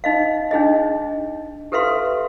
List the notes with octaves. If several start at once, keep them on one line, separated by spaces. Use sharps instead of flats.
D#4 D#5 F5
D4 D#4 G#4 D#5
G4 A4 B4 E5 F5 C6